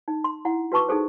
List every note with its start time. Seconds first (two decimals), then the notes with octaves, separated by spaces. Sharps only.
0.08 D#4
0.24 C6
0.45 E4 F#5
0.72 F#4 B4 A5 C#6 D6
0.89 D#4 G#4 A4 C5